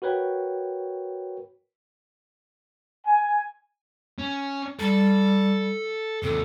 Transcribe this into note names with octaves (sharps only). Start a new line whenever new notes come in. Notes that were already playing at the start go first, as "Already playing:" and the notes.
F#4 A#4 B4 C#5 G5
G#5
C#4
G3 A4
D#2 C3 A4